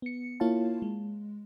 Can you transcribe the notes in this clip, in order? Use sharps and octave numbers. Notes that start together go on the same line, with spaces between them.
B3 C#7
A#3 E4 F4 C#5 F5 A5
G#3